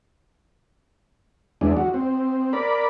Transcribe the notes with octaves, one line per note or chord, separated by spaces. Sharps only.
E2 G#3 D4
F#4
C4
A#4 D5 B5